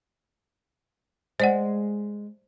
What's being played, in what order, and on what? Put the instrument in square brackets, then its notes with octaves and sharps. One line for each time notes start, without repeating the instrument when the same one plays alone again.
[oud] G#3 [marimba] C5 D5 F#5